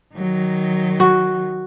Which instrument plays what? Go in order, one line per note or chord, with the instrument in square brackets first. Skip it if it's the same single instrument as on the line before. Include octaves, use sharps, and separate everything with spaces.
[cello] D#3 F#3
[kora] F#4